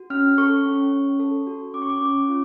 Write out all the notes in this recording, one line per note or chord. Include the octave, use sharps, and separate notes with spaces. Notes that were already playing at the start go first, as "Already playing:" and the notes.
Already playing: F#4
C#4 F6
A4 C#6
C#4
C#4
A4
F#4
C#4 D6
C#6
D6
C#4
F4